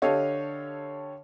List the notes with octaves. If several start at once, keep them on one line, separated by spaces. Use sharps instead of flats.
D3 G4 A4 C#5 D#5 F5